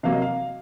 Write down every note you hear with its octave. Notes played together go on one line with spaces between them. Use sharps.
C3 F#3 A#3 F5
D#5
F5